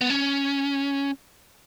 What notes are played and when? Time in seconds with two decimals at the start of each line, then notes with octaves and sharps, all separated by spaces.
0.01 B3
0.10 C#4